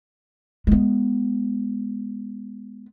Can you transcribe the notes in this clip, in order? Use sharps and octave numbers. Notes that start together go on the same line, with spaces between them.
G#3 B3